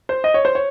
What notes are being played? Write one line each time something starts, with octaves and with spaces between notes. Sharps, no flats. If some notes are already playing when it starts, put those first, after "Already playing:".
C5
D#5
C#5
C5
C#5